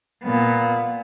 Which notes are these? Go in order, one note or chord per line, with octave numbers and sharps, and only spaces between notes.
A#2 B3